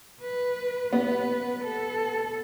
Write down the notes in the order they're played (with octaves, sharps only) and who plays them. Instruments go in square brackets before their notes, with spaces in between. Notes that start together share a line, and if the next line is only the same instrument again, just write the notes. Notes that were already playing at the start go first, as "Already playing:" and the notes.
[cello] B4
[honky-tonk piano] B3 [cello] B4
[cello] A4